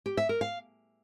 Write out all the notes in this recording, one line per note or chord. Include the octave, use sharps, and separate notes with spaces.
G4
E5
A#4
F5